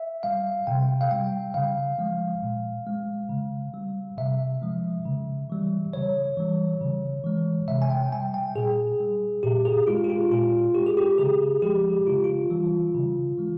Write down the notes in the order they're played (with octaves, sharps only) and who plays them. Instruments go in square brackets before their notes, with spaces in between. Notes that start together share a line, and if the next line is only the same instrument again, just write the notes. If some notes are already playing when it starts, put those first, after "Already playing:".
Already playing: [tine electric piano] E5
G3 F5
C3 G5
F5
G3 G5
C#3 F5
F3 G#3
A#2
G#3
C#3
G3
C3 E5
F3 G#3
C#3
E3 G3
C#3 C#5
E3 G3
C#3
E3 G#3
C3 E5
G#5
G5
G3 G#5
G5
A#2 G#4
G3
A#2 G4
G#4
G#3 F4
G4
F4
A#2 F4
G#3 G4
G#4
G4
C#3 G#4
F3 G#3 G4
C#3 F4
F4
E3 G3
C#3
E3 G#3